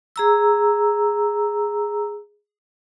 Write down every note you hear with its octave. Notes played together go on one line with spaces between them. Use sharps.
G#4 A#5 E6